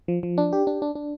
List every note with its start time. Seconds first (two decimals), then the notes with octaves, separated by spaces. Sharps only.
0.08 F3
0.23 F3
0.38 D4
0.53 G4
0.67 D4
0.82 D4
0.95 D4